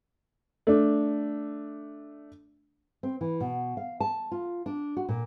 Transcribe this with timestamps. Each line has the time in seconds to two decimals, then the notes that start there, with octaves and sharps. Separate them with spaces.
0.67 A3 D4
3.03 C4
3.21 E3
3.40 B2
3.77 F5
4.00 A5
4.31 F4
4.66 D4
4.97 F#4
5.09 A#2